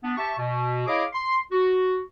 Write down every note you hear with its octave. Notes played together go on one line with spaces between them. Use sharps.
B3 D4
G4 E5 A5 C#6
B2
E4 G#4 C#5 D#5 F5 D6
C6
F#4